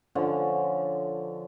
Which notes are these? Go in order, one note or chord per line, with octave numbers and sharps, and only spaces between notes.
D3 F3 C#4